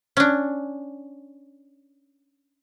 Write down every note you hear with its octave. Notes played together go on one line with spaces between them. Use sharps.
C#4 D4